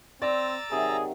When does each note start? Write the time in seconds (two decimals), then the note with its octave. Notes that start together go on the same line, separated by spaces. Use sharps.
0.22 C4 D5 A#5 E6 A6
0.71 C3 D#3 F#3 G#4